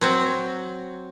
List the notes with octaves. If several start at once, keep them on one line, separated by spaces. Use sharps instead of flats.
F#3 C4 F#4